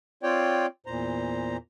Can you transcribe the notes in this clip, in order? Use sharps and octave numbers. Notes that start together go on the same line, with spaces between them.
C4 F4 C#5 D5 G5
E2 A#2 C5 A#5